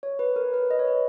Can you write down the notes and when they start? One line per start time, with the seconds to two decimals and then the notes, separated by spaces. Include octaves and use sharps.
0.03 C#5
0.19 B4
0.36 A#4
0.54 B4
0.71 D#5
0.79 C#5
0.87 B4